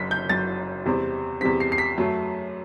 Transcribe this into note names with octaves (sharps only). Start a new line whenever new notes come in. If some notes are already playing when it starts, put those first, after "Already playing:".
Already playing: F#1 F#2 F#3 B6
G6
F#1 F#2 F#3 A6
E2 C3 G3 C4
E2 C3 G3 C4 B6
C7
C7
B6
F#2 F#3 A3